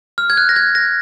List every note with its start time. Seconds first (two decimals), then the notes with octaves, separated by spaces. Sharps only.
0.18 F6
0.30 G#6
0.37 F#6
0.49 A#6
0.56 G#6
0.75 A#6